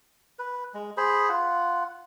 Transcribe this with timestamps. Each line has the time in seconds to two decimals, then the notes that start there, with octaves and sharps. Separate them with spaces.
0.39 B4
0.74 G#3
0.97 G#4 C5 B5
1.29 F4 F#5